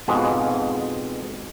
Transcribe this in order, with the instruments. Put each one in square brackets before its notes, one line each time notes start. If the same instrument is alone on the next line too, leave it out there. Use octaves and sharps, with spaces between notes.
[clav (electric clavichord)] F2 G#2 B2 G#3